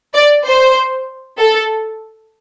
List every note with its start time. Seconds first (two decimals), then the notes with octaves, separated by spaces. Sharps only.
0.13 D5
0.45 C5
1.38 A4